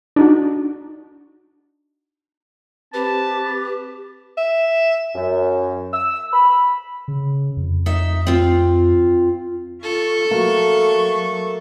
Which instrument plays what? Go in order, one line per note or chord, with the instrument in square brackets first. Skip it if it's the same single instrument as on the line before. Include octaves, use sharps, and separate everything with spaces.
[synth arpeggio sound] D4 D#4 F#4
[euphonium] C4 [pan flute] G4 [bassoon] B4 [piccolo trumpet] A5
[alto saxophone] E5
[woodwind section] F#2
E6
B5
[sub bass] C#3
F2
[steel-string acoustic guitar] D#4 E5
C4 F4
[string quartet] F4 C#6 [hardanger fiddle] A4
[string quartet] F#3 C#6 [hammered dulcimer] A3 A#3 F#4